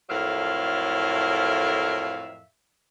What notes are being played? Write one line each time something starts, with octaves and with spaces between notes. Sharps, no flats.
F2 A2 F#3 A#4 E5 F5